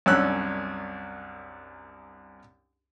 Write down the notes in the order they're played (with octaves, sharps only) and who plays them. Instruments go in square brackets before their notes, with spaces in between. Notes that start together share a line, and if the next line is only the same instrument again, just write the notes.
[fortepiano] C2 F#2 C#4 D4 E6 F#6